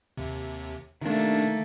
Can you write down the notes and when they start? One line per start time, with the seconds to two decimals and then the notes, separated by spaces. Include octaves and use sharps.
0.17 D#2 C3
1.01 C3 D#3 A3 A#3 D4